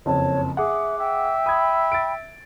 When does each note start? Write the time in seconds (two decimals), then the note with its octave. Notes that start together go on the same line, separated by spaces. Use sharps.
0.06 F#1 F2 C4 C#5 A5
0.57 G#4 E5 F#5 D6
0.99 E5 G5
1.46 B5 D#6 G#6
1.92 A6 D7